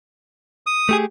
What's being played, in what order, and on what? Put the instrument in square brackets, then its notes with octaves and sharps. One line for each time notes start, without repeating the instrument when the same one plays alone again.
[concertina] D#6
[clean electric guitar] A3 G4 G#4